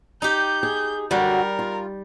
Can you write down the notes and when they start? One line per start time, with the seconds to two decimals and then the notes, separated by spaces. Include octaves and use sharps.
0.22 D#4 G4 G6
0.63 G#4
1.11 F#2 D3 G3 F#4 A#4
1.59 F4